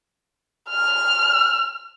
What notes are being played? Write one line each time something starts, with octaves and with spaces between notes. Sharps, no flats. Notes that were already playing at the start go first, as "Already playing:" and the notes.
F6